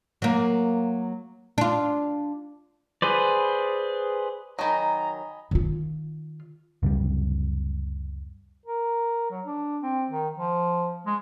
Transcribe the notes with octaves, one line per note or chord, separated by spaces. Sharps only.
F#3 A#3
D4 F4
G#4 B4 C5 D5
D#3 F#3 D#5 G#5 A#5 B5
D#3 F4
C#2 F#2 C3 G3
A#4
F#3
D4
C4
D#3
F3
G#3